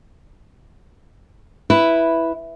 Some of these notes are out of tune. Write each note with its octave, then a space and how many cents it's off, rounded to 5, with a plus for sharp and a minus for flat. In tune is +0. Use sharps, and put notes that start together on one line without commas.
E4 +0 B4 +0